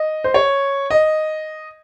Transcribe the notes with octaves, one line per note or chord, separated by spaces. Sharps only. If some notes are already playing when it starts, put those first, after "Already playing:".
Already playing: D#5
C5
C#5
D#5